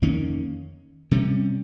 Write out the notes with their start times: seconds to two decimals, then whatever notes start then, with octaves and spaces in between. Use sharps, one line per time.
0.02 F2 D#3 A#3 C#4
1.11 C3 G3 C#4